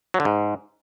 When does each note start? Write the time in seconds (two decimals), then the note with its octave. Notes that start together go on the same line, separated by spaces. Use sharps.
0.14 F#3
0.20 D3
0.25 G#2